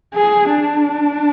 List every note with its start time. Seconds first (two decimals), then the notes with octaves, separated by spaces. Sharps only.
0.15 G#4
0.52 D4